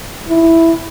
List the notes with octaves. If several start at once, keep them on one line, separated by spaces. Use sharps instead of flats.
E4